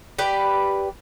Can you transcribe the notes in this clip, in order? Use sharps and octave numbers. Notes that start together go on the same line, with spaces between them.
G4 B4 D5